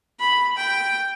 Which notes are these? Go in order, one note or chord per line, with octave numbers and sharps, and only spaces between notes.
B5
G5